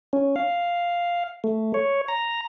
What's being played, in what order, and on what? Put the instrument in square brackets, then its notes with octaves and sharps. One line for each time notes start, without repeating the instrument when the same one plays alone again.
[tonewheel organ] C#4
F5
A3
C#5
A#5